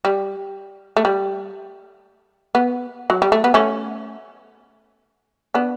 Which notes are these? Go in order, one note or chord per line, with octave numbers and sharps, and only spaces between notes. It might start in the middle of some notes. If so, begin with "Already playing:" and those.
G3
A3
G3
B3
F#3
G3
A3
B3
A3 C#4
B3 D4